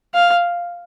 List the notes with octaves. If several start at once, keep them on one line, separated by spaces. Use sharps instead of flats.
F5